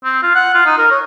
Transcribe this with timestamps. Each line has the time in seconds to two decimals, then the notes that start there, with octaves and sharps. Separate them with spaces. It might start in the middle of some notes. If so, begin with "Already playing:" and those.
0.04 C4
0.23 F4
0.35 F#5
0.55 F4
0.66 D#4
0.78 A#4
0.91 C#5